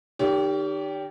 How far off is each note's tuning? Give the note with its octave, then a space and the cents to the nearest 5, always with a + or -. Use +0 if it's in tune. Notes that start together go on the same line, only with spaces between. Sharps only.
D#3 -30 G4 +0 C#5 +45